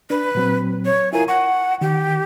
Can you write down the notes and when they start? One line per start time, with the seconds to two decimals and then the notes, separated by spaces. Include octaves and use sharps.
0.10 D4 B4
0.35 A#2 F#3 C4
0.85 C#5
1.13 E4 F4 A#4 G#5
1.28 F#5 C#6
1.81 D#3 G4